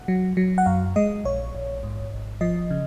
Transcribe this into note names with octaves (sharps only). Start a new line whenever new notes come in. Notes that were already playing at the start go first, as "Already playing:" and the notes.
Already playing: F#5
F#3
F#3
F#5
F#2 F5
G#3 D#5
A#1 C#5
A#1
G#2
G#1
F3 D#5
C#3